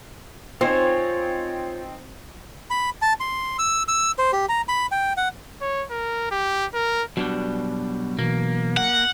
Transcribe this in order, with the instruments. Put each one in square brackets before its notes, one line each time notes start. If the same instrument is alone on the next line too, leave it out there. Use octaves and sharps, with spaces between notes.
[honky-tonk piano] C4 D#4 [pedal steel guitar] F4 C#5 G#5 [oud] C5
[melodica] B5
A5
C6
E6
E6
C5
G4
A#5
B5
G5
F#5
[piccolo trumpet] C#5
A#4
G4
A#4
[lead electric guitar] B2 G3 [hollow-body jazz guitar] F#3 D4
[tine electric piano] B2 E3 B3 [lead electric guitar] A#3
[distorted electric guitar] F#5